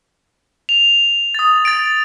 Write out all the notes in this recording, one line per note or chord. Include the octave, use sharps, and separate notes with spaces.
F7
D#6 A6
A6 D7